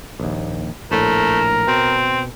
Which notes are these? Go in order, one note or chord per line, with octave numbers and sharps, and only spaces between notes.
A#1 D#2
A#1 A2 A3 A#4
B2 C4